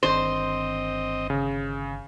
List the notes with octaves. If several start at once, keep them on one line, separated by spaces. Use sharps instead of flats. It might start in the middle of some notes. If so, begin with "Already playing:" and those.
G1 D#3 C4 D4 C5 D#5
C#3